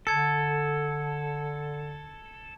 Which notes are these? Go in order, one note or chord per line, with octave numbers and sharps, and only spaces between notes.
D3 A4 A5 G#6 C#7